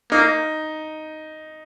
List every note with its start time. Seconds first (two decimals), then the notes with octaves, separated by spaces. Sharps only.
0.11 A#3 D#4